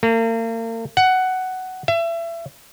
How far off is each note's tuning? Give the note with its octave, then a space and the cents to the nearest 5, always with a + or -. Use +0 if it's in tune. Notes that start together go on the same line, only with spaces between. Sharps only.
A#3 -40
F#5 +10
E5 +30